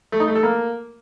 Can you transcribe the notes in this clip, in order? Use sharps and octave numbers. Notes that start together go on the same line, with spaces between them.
A3
D#4
A3
A4
A#3